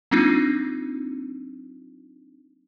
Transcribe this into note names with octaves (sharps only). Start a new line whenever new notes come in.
F#3 A#3 C4 D4 D#4 F4